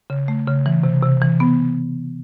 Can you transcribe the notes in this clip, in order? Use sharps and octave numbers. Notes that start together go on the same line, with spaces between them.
C#3
A3
C#3
E3
C3
C3
E3
B3